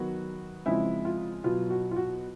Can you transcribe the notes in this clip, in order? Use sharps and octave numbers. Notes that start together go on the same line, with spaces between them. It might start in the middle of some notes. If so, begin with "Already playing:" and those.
Already playing: D#3 F#3 B3 F#4
C#3 F3 G#3 C4 E4
F4
B2 F#3 B3 F4
F#4
F4
F#4